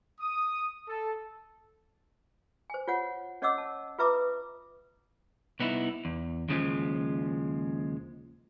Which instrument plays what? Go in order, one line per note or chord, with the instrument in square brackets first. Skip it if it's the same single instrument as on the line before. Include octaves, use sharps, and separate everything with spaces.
[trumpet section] D#6
A4
[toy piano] C5 G#5
F4 C#5 F#5
C#4 C#5 D#5 F#5 D6 E6
A5
F4 B4 E5 A#5 D6 D#6
[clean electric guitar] C2 B3 D#4 E4
E2
D#2 C#3 F3 G#3